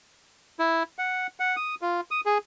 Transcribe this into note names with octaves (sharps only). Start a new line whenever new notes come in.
E4
F#5
F#5
D#6
F4
D#6
G#4